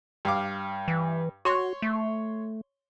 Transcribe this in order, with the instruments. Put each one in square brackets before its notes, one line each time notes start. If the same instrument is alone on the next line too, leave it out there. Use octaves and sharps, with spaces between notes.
[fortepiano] G2 F5 D6
[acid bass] E3
[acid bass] F#4 [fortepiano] C#5 C6 C#6
[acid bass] A3